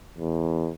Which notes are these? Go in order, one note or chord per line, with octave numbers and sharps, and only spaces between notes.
E2